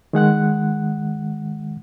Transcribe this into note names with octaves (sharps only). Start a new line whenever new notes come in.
D#3 G#3 F#5 F#6